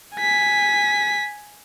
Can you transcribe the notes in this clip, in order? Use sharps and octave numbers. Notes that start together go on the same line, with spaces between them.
G#5 B6